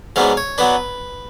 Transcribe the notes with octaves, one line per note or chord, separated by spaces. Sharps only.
G#2 F#3 B3 D4 F5
C#5
F#3 B3 D4 B4